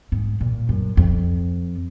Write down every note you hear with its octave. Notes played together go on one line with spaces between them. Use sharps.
G#2
A#2
F#2
F2